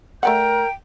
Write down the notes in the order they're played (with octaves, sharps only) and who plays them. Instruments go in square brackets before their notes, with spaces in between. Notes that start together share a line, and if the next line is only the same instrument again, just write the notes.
[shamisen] A3 D5 F#5 [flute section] A#4 A#5 G6 [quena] G5